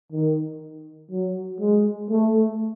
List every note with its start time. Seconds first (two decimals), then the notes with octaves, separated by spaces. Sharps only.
0.12 D#3
1.11 F#3
1.60 G#3
2.10 A3